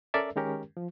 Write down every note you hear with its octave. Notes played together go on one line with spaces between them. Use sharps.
C#4 A4 A#4 D5 E5
D#3 G#3 C#4 G4 A#4
F3